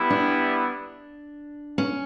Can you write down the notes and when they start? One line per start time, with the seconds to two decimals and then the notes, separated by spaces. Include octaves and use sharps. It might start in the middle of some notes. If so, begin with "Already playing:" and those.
Already playing: G3 B3 E4
0.10 D4
1.78 C#4